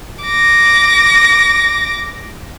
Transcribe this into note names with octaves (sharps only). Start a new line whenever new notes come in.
D6 A#6